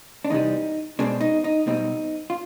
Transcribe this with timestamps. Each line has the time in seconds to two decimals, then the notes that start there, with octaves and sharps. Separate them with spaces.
0.25 D4
0.30 E2 C3 E3 G3 D#4
0.99 B2 G#3 C4 D4
1.21 D#4
1.44 D#4
1.66 B1 B2 G3 C4 D#4
2.30 F4